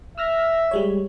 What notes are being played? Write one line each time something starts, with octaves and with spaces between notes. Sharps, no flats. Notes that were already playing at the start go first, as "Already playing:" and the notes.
E5 E6 F6 A#6
G3 G#3 C#5